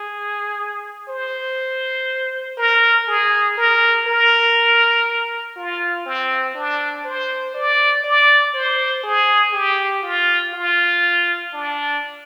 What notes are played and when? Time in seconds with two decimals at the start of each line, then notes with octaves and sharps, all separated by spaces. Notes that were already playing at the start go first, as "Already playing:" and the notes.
Already playing: G#4
1.09 C5
2.58 A#4
3.08 G#4
3.58 A#4
4.07 A#4
5.57 F4
6.06 C4
6.55 D4
7.05 C5
7.54 D5
8.04 D5
8.54 C5
9.03 G#4
9.53 G4
10.03 F4
10.54 F4
11.53 D4